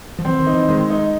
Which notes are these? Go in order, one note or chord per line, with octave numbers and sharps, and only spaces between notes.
F3
E3 C4
D#3
D#4
E3
D#3 G#3
D#4